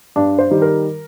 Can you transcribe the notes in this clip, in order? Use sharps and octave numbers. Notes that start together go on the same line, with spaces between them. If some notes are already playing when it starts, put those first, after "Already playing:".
G2 D4
C5
D#3 G3
A#4